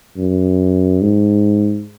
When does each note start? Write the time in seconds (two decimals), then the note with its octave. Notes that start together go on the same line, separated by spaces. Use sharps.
0.17 F#2
1.02 G#2